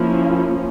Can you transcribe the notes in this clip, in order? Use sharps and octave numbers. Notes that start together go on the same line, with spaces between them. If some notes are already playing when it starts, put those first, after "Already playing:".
Already playing: F3 A#3 C#4 E4